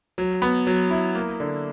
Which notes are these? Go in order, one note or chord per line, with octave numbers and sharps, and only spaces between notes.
F#3
B3
F#3
E4
A#3
D3